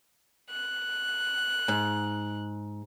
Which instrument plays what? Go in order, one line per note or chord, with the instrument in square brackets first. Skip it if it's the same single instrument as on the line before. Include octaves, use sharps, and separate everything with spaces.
[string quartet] F#6
[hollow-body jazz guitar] G#2